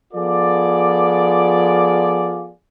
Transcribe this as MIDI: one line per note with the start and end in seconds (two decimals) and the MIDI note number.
0.14 2.50 53
0.14 2.50 59
0.14 2.50 65
0.14 2.50 68
0.14 2.50 69
0.14 2.50 74